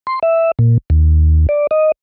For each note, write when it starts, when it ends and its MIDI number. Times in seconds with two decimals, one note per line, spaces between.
0.07 0.19 84
0.23 0.51 76
0.59 0.78 46
0.90 1.47 39
1.49 1.67 74
1.71 1.92 75